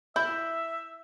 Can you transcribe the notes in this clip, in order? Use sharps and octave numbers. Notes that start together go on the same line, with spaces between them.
E4 E5 G6